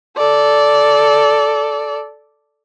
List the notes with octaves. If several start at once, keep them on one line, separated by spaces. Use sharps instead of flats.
A4 D5